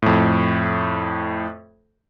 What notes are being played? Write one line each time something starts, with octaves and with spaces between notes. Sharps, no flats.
F2 A2